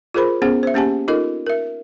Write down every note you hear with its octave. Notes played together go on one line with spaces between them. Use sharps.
F4 G#4 A#4 C5 B5
B3 C#4 G#4 C5 F#5
C5 E5
A#3 C#4 G4 F#5 G#5 A5
D#4 F4 A4 A#4 D#5
A#4 E5